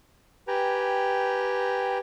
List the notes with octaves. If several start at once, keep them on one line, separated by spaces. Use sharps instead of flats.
G4 B4 G5 G#5 A#5